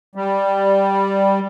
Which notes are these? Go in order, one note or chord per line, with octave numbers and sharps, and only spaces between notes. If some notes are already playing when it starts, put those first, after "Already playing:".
G3